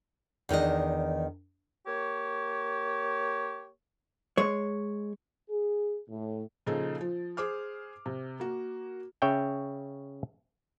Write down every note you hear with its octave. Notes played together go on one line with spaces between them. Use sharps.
E2 D#3 D4 D#5
A#3 G4 C#5
G#3 C#5
G#4
A2
A#2 C#3 F3 D#4 G#4 A4
F3
G#4 C5 D6 F6
C3
A#3 F#4
C#3 C#5 E5 G5